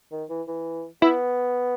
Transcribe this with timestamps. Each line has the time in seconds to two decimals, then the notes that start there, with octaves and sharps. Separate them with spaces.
0.12 D#3
0.30 E3
0.48 E3
1.02 B3 E4